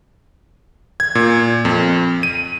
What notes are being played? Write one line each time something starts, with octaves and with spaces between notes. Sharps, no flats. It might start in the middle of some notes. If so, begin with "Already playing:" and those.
G#6
A#2
F2
D#7